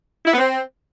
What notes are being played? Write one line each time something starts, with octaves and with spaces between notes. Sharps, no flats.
E4
B3
C4